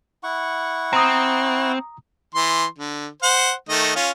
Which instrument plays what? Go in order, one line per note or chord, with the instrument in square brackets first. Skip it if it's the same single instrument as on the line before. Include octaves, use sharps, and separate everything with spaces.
[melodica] E4 F#5 C#6
[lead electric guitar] C4 [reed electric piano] A#5 D#6
[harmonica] E3 C6
D3
C5 F#5
D#3 A3 D#5
C#4 F4